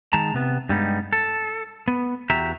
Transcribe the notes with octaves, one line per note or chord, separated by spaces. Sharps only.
D#3 G#3 A5 A#5
C3 B3
G2 G3 G#3 B3 D#4
A4
B3
E2 F#4 G4 E5 A#5